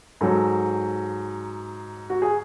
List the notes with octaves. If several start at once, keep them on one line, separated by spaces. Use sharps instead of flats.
G#2 F#3 A4
F#4
G#4